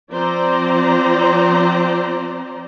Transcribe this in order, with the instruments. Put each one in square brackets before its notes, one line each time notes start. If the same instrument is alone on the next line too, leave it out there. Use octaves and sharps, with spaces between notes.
[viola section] F3 C4 C5 D5 A#5